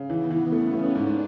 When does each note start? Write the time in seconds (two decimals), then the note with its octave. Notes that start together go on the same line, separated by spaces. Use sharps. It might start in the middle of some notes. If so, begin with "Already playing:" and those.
Already playing: C#3
0.09 E3 B3
0.30 E3
0.52 A3 C#4
0.73 A3
0.95 G#2 D4